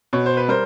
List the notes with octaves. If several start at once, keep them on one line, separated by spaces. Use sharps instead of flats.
B2 C#5
C5
B4
G3 A#4 C5